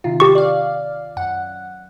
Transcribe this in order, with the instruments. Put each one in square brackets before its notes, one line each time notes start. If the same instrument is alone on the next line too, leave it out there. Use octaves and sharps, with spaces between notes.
[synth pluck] C3 D#3 F4
[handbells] G4 C#6
[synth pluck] D5 F5
F#2 F#5